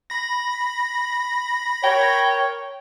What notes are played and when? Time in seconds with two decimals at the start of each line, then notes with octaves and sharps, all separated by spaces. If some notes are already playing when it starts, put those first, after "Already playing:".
0.10 B5 A#6
1.84 A#4 C#5 G5